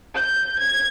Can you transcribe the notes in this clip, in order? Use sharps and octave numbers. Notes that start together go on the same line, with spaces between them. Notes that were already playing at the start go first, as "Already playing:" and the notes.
G6
G#6